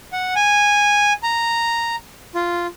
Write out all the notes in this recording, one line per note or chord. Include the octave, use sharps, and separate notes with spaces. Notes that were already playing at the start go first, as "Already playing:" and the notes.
F#5
G#5
A#5
F4